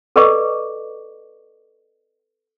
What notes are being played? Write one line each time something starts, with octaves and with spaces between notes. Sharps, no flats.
A4 B4 D5 D#5 C#6 D6